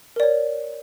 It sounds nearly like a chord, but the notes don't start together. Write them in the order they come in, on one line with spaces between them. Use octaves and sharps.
A#4 D5 C#5